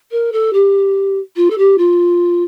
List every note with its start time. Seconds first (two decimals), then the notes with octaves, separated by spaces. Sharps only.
0.11 A#4
0.32 A4
0.53 G4
1.36 F4
1.50 A4
1.58 G4
1.78 F4